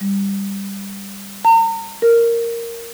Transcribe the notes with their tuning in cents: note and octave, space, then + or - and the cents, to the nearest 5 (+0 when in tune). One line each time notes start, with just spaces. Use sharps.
G3 +15
A#5 -40
A#4 -5